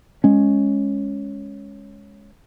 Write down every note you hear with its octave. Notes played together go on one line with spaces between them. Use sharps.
G#3 C#4